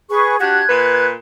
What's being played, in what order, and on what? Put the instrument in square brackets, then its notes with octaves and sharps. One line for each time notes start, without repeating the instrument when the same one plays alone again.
[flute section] G#4 B4 C#6
[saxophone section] D4 F#4 G4 [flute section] F#6 G#6
[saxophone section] A#2 B4